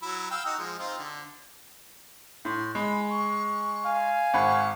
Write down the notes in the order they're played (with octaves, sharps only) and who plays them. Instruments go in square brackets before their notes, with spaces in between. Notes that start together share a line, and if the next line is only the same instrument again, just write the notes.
[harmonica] F#3 E4
F5 G5 E6
D#4 F#4 D#5
F3 G#3
C4 D#4 F4
D3
[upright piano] A2 [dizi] C6
[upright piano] G#3 [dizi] B5
[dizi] C#6
[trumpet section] F5 G#5
[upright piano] G#1 F#5 B5 [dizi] C#6